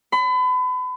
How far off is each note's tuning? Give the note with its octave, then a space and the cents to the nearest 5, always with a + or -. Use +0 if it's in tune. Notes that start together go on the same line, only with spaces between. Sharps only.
B5 +35